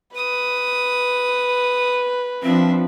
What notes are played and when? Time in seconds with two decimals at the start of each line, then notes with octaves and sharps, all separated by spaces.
0.16 B4 D#6
2.43 F3 C4 D4 E5